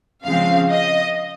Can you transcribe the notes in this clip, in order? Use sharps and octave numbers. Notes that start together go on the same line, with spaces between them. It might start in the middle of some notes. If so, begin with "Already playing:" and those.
C#3 F3 G#3 C4 F5
D#5